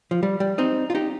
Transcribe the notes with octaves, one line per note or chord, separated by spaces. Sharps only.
F3
G3
G3
C4 D#4
F4
D#4 G4